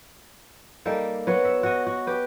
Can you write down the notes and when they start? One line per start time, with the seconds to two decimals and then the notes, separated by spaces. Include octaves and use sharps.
0.85 G3 A#3 D#4 A4
1.27 F#3 B3 F#4
1.44 E5
1.63 F#4 D#5
1.86 F#4
2.07 G4 B4